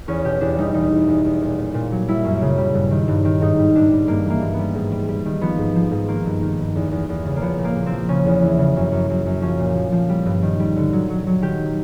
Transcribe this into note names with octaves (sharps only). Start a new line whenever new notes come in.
E2 C#4
B2 G4
E2 D4
G3 D#4
E2 D#4
E2
E2
E2
A#2
A#2
A#2
F#3
G3 E4
F#2
C#3
G3
G2
D#3
G2
D#3
G#2 D#4
G3
G#2 D4
G3
G2 A#3
E3 A#3
G2
B3
G3
G#2
G3
G3
D#3
F3 B3
G#2
F3
G#2
D#3 A#3
G2
D#3
G2
E2
E2
E2
C#3
A#3
F3 B3
A#2
A#3
A#2
C4
F3
C#3 C#4
E2
E3
C#3
F#2
F#2
F#2
F#2
F3 C#4
A#2
F3
F3
G3
G2
D#3
G3
D3
F#3
F#3
F#3
D#3 G4